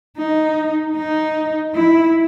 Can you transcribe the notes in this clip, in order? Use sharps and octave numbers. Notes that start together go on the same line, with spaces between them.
D#4
D#4
E4